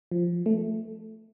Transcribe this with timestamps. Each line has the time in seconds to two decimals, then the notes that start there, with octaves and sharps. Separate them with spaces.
0.11 F3
0.46 A3